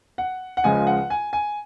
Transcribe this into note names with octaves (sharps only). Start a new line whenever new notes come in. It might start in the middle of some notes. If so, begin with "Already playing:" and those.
F#5
F#5
C#2 C#3 F3 G#3 G#5
F#5
G#5
G#5